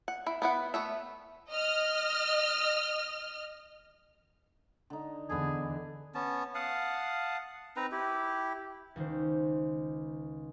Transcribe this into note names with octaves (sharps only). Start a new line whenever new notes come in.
F#5
E4
B3 E4 F#5
A3 B3 E5
D#5 F6
D3 D#4
E2 D3 B3 D4 G#4 A4
B3 C#4 A5
F5 F#5 A5 D#6
C4 D#4 B4 A#5
E4 G4
C#2 D#3 C5